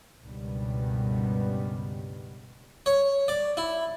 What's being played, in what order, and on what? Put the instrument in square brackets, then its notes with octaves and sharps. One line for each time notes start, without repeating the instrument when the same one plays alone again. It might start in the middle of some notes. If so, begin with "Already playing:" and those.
[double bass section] C#2 G2 B2 D#3 G3 B3
[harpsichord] C#5
D5
E4